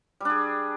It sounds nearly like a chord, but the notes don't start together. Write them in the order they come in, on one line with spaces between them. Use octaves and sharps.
G3 D4 G#4